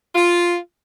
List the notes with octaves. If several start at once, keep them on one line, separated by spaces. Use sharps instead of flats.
F4